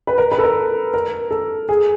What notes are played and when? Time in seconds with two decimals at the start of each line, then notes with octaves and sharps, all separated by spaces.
0.07 B4
0.18 A#4
0.32 B4
0.38 A4
0.44 A#4
0.94 A#4
1.31 A4
1.69 G#4